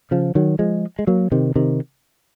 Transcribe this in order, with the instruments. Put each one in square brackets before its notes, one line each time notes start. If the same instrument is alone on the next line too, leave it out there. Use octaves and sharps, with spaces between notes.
[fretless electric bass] C#3 F3
D#3 F#3
F3 G#3
G#3
F#3 A#3
C3 D#3
C3 D#3